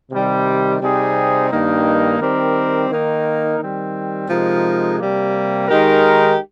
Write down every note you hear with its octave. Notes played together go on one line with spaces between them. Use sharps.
C3 D#3 G3
C3 G3 C4 D#4 G#4
G2 D#3 A#3 D#4
D#3 G3 C4 G4 A#4
D#3 A#3 D#4 A#4
D#3 G3 C4
C3 F3 G#3 D#4 A#4
C3 G3 A#3
D#3 G#3 D#4 G4 A#4